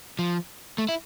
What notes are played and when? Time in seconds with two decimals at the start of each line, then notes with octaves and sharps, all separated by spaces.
0.19 F3
0.78 A3
0.89 E4